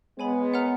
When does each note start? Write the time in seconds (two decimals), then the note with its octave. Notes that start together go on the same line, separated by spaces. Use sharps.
0.18 G#3 B3 C#5 G#5 B5
0.54 A#4 C#5 F#5 A#5 F6